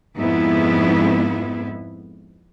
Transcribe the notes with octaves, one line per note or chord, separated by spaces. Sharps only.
F2 G#2 B3 E4